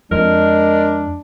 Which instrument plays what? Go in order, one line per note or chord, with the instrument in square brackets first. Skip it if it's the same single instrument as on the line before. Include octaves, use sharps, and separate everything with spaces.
[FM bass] F2 [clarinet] G#3 [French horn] D4 [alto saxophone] A#4